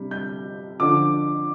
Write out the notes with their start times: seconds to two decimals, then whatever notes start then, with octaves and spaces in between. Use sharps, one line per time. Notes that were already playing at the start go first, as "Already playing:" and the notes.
Already playing: C3 G3 D4
0.11 G6
0.80 D3 F3 D4 D6